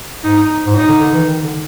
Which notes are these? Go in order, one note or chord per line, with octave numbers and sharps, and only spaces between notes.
G#2 D#4
G#2
A2 D#4
D3
D3
E3
D#3
D3